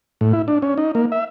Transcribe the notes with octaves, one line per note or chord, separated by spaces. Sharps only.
A2
E4
D4
C#4
D#4
A#3
E5